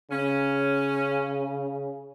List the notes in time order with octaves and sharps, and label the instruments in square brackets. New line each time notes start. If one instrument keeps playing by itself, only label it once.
[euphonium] C#3 [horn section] C#4